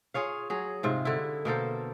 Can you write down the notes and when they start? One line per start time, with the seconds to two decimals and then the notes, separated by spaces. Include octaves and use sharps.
0.14 F4 G#4 C#5 F5
0.50 F#3 G#4
0.83 G#2 C3 F4
1.05 D3 E4
1.45 B2 A#3 A4 C5